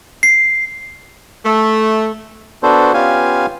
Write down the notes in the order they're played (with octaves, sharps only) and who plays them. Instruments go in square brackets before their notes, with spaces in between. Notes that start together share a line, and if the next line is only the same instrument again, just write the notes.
[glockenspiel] C7
[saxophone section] A3
[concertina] B3 D4 F#4 A4 C5
B3 C#4 F4 G4 F5 G#5